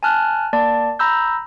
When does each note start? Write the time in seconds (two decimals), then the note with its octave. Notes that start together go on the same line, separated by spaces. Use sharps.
0.03 G#5 A5 F6 F#6
0.53 A#3 D5 A5
0.99 A#5 B5 E6 G6